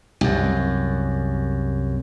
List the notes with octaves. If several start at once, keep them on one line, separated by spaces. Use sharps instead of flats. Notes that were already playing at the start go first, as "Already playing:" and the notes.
C2 F#2